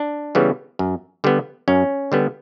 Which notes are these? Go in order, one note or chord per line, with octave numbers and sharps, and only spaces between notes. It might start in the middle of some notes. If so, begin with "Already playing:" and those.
Already playing: D4
C#3 E3 G3 B3
F#2
D3 G3 B3
F#2 C#4
D3 G3 B3